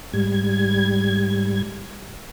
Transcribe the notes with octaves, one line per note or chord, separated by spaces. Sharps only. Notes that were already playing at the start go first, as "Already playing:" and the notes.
G#2 G3 G#6